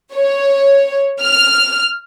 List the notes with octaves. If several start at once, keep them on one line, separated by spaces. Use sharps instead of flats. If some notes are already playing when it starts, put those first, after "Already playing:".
C#5
F6